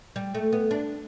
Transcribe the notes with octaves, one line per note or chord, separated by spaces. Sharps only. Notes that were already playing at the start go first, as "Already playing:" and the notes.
G3
A3
B3
D4